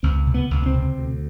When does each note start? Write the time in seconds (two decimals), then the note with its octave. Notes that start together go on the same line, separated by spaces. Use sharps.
0.03 C#2 C4
0.27 C3
0.34 B3
0.51 C#2
0.62 B3
0.66 C4
0.74 C3
0.98 D2